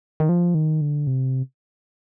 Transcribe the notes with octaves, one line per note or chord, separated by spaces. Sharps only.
D#3
F3
D#3
D3
C3